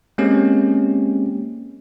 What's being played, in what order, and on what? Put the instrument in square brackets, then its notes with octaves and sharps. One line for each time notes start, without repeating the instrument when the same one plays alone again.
[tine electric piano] G#3 A#3 C4 C#4 G4